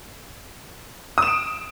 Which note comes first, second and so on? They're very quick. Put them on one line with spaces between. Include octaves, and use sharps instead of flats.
D#6 E7 D7